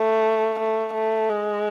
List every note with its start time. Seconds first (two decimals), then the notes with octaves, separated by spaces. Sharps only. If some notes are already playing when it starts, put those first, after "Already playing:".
Already playing: A3
0.60 A3
0.93 A3
1.29 G#3